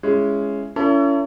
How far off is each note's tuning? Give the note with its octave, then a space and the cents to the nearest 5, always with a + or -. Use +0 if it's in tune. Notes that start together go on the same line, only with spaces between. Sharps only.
G#3 +0 C#4 +0 E4 +25
C#4 +30 E4 +35 A4 +40